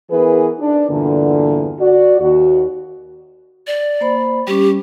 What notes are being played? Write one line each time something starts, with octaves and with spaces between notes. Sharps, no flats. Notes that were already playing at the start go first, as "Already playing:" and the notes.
E3 B3 G#4 A#4 B4
D4
E2 G2 A#2 D3
F#4 D5
D#2 F#4
D5
A#3 C5 B5
G3 C#4 G4